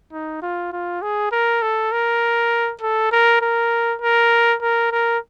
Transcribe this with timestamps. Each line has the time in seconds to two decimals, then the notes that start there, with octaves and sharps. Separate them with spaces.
0.12 D#4
0.42 F4
0.72 F4
1.02 G#4
1.32 A#4
1.62 A4
1.92 A#4
2.81 A4
3.12 A#4
3.42 A#4
4.02 A#4
4.61 A#4
4.91 A#4